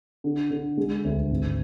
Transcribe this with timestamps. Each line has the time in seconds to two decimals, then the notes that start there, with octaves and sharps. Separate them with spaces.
0.24 D3
0.50 D3
0.77 G#3
1.04 D2
1.31 G#1